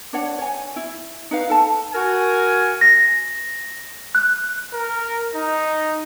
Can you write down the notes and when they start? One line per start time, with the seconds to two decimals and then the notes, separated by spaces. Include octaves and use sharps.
0.13 D4 C#5 F#5
0.38 C#5 G#5
0.76 E4
1.31 D#4 B4 F5
1.50 A4 A5
1.93 F#4 A#4 G#5
2.81 A#6
4.15 F#6
4.73 A#4
5.35 D#4